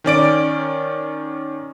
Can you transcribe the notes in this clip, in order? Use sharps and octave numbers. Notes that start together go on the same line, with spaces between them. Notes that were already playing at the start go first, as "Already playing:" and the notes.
D#3 C#4 D5 D7